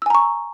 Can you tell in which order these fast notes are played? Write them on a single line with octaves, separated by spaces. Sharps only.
E6 G#5 A#5 C#6